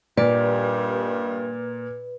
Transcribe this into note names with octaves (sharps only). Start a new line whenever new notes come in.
G2 A#2 D#3 G3 B4 D5